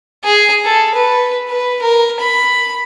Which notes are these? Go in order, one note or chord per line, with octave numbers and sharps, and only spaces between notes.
G#4
A4
B4
B4
A#4
B5